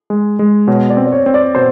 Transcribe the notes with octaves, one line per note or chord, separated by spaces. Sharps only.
G#3
G#3
B2 C#5
D5
C4
D5
C#5
C4
D5
B2 C5